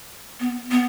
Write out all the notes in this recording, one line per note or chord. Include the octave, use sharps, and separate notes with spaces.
B3
B3